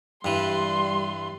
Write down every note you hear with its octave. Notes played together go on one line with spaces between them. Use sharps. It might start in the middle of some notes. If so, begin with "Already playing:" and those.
G2 E3 G3 C6